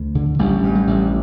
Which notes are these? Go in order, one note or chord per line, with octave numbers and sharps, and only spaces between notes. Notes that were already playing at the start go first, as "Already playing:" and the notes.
Already playing: D2
D3
A1 G3
G2
G3
A1